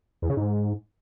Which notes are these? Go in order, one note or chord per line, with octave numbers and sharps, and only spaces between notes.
E2
C#3
G#2